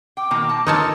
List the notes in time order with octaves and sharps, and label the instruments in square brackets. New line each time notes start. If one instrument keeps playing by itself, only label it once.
[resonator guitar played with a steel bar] G5 [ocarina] D6
[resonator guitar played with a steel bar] B2 D#3 A#3
A5
[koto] D#4 C#5 A5 [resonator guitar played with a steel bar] F4 A4 A#4